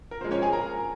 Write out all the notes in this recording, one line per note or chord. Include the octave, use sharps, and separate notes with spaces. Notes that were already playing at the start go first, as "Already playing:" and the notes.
A#4
A#2 F3 G#3 C5
C#4 C#5
G#4 G#5
A#4 A#5